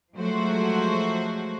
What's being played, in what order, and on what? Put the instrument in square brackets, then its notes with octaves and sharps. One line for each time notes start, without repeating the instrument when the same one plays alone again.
[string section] F3 F#3 G#3 A3 F#4 C5